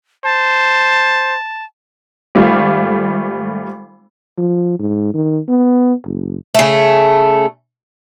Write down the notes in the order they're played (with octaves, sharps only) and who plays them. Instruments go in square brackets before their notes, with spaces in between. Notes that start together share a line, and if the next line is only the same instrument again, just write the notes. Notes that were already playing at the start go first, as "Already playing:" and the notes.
[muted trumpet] C5 [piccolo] A5
[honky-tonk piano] G#1 G3 A3 F4
[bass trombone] F3
G#2
D#3
B3
F#1
[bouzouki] C#3 A3